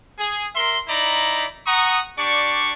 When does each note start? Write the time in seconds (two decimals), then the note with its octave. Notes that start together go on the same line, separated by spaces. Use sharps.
0.18 G#4
0.55 A#4 E5 C6
0.88 D#4 E4 D5 A#5 B5
1.66 F#5 A#5 C#6 D#6
2.18 D4 G4 D5 C#6